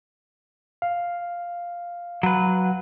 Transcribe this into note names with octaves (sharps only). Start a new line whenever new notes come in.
F5
F#3 B4